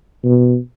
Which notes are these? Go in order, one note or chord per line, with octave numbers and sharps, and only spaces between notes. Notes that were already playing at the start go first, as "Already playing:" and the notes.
B2